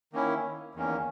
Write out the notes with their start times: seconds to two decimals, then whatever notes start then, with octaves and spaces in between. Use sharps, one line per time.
0.13 D#3 A#3 C#4 E4
0.75 E2 D#3 A#3 C#4